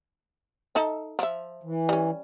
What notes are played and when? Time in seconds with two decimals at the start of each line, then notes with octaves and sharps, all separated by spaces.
0.75 D#4 A4 E5
1.19 F3 E5
1.63 E3
1.89 G3 C#4